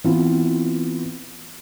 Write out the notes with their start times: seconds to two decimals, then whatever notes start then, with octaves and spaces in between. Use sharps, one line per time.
0.04 E3 B3 C4 E4 F4